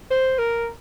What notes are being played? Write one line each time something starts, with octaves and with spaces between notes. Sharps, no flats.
C5
A#4